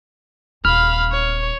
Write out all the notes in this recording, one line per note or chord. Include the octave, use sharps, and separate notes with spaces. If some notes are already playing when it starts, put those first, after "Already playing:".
D#1 C4 F5 B5 F6
C#5